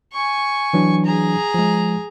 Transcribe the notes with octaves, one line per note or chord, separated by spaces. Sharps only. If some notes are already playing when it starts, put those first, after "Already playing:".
G#5 C#6
E3 F#3 D4
G#4 A#5
F3 G#3